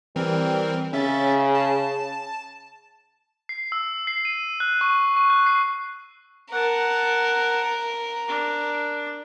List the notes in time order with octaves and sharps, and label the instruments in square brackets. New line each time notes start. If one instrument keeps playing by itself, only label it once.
[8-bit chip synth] E3 C4 A#4 [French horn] G3
[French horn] C#3 [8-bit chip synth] C#4 E5 A6
[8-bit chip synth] A5
[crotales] C7
E6
C7
D#7
F#6
C#6
C#6
F#6
C7
[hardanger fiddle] A#4 [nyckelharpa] F#5 A5
[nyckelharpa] D4